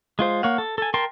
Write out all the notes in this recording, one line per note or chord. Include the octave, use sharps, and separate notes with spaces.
G#3 F4 C5
A#3 C#5 F5 F#5
A4
A4 G#5
A#4 G5 A5 C6